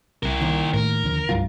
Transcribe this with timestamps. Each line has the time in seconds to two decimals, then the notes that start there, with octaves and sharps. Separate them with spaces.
0.23 C2 E4 A#4
0.40 D#2 D#3
0.74 A2 A#4
1.04 D#2 D3 F3
1.29 F1 C2 G2 F4